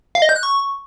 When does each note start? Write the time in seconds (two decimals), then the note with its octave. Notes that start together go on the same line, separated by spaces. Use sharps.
0.15 F5
0.22 D#5
0.29 G6
0.36 F#6
0.43 C#6